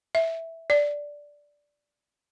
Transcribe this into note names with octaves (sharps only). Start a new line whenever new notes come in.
E5
D5